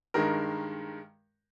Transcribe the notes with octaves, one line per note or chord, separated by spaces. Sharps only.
G2 D#3 G#3 A#4